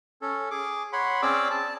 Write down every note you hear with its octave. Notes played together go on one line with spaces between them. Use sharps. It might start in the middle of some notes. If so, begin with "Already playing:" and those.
C#4 A4
G#4 D6
C#5 F#5 B5 C6
C4 C#4 G#4 D5 D6 E6
A5